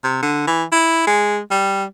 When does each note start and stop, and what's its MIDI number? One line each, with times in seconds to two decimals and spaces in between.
0.04 0.18 48
0.23 0.45 50
0.47 0.64 52
0.72 1.03 64
1.07 1.39 56
1.51 1.84 55